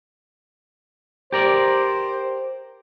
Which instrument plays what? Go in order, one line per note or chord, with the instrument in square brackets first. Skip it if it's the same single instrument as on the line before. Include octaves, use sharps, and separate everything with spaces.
[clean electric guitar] G4 A#4 D5 [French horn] C5